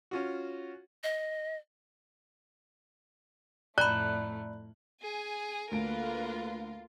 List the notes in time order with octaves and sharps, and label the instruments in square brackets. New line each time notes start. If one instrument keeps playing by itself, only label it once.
[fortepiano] C#4 F4 F#4
[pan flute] D#5
[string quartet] F2 A2 A3 [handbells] D5 A#5 B5 [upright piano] F#6
[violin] G#4 G#5
[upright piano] D2 D7 [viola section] D3 A#3 B4 [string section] F4 [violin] A#4